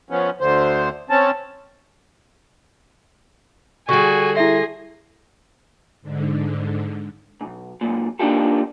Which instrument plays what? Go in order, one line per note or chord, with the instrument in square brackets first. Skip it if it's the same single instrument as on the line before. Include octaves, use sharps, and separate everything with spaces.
[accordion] F3 B3 C#4
D2 D3 C5
C4 C#4 A5
[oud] D3 G3 [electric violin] F#4 G#4 [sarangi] G#5 [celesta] C#6
[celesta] E4 E5 [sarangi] G#4 [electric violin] C6 A#6
[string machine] G#2 D3
[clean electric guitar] B1 G#2
F#2 A#2
A#3 D4 D#4 F4 G4 A4